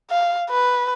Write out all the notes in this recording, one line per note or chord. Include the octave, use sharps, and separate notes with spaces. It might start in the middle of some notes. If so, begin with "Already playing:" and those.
F5
B4